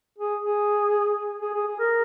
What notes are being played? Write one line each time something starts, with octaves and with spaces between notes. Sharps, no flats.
G#4
G#4
G#4
G#4
G#4
A#4